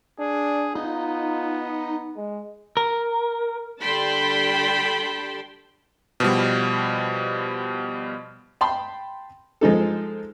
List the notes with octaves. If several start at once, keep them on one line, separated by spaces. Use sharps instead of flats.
D4 G#4
B3 D#4 F4
G#3
A#4
D3 G3 G5 A5 B5 C6
B2 F3 G3
G5 A5 B5 C6
F3 G#3 D#4 A4